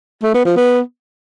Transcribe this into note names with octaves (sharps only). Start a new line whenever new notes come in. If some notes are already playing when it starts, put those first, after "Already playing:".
A3
B3
F3
B3